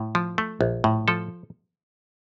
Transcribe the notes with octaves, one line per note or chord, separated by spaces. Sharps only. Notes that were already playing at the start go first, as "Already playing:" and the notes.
Already playing: A2
F3
A3
A#1
A2
F3 A4